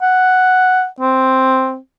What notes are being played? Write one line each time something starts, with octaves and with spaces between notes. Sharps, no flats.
F#5
C4